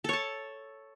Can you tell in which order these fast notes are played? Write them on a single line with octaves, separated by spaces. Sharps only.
A4 C#5 A5